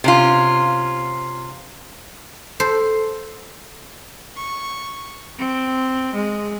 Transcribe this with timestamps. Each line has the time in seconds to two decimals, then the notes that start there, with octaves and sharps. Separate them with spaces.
0.04 C3 C#4 F4
2.60 A4 C5
4.36 C#6
5.37 C4
6.14 G#3